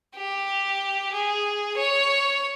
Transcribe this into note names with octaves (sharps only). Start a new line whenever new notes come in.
G4
G#4
C#5